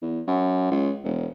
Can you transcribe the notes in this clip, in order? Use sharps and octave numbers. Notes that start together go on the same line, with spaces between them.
E2
F#2
C#2
E1